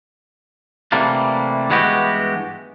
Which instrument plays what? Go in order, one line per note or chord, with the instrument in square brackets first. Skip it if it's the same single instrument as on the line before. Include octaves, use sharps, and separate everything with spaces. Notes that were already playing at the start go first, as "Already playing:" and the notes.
[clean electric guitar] C3 E3 G3 A3 A#3 D4
G2 E3 G#3 B3 F#4 G4